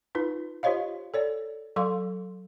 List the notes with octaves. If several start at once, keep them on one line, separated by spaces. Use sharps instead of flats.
D#4 F4 B4
F4 G4 C5 C#5 D#5 F5
A4 C#5 D5
F#3 A4 F5 C6